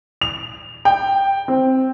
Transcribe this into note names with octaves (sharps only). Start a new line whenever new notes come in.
F7
G5
C4